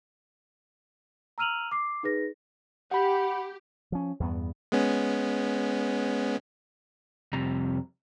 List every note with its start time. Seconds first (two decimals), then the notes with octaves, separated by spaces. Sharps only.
1.38 A#5 E6 F6 D#7 F7 F#7
1.71 D6 C7
2.03 D#4 G#4 B4 A#6
2.91 G4 F#5 B5
3.92 F3 C#4
4.20 E2 G2 B3
4.72 G#3 B3 C#4
7.33 F2 C3 G3 A#5